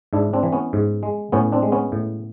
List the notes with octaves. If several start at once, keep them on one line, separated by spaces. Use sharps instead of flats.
G#2 D4 E4
C4 D4
E3
B3 C#4
G#2
G#3
A2 B3 C#4
C4 D4
G#3
B3 C#4
A2